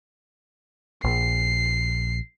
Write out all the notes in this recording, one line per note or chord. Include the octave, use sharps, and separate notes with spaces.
A#1 C7